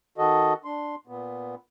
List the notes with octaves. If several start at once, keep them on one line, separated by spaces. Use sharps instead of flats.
D#3 F#4 A4 D#5
D4 C6
A#2 B3